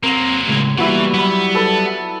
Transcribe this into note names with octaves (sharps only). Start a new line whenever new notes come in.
F#3 A#3 C4 A#4
A2 C#3 G#3
E3 G3 A#3 B3 E4 F#4 B4
F#3 G3 B3 B5
A4 B4